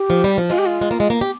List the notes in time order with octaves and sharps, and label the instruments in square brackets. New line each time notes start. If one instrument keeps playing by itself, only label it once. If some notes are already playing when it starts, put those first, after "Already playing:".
Already playing: [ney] G4
[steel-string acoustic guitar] F3
G3
F3
[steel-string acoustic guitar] G#3 [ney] F4
[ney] G4
F4
[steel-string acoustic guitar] G#3
A#3
G#3
A#3
G4